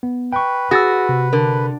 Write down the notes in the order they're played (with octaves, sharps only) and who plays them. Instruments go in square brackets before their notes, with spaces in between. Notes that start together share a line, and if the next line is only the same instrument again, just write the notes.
[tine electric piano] B3
[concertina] B4 [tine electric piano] G5 C#6
[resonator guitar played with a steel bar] F#4 [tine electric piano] G#4 [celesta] E6 A6 A#6
[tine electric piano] C3
[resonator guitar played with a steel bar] D3 [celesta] A#4